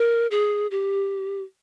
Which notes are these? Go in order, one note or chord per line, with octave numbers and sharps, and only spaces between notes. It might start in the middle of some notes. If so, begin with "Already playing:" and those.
Already playing: A#4
G#4
G4